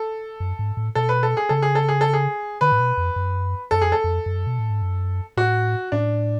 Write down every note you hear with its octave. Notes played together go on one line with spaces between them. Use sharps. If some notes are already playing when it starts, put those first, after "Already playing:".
Already playing: A4
F#2
G#2
A2
B2 A4
B4
A4
G#4
C#3 A4
G#4
A4
G#4
A4
G#4
D3 B4
A2
B2
F2
F#2
F#2 A4
F2 G#4
A4
F2
F#2
B2
A2
G#2
F#2
A2 F#4
A2 D4